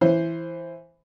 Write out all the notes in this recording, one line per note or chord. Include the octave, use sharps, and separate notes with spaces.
E3 C5